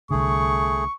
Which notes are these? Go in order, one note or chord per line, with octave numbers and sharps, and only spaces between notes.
C2 D3 A3 G#4 C#6